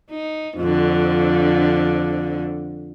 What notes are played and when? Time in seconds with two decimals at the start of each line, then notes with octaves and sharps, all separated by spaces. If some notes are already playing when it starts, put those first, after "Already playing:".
0.10 D#4
0.58 F2 D3